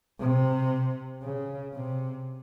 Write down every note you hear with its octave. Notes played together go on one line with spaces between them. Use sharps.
C3
C#3
C3